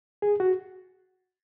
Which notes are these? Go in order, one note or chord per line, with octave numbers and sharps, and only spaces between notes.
G#4
F#4